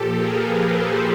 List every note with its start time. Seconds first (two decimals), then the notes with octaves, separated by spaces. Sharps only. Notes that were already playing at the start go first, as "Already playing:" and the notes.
Already playing: A#2 F3 G4 A4
0.12 G#4 A#4
0.39 A4 B4
0.68 A#4 C5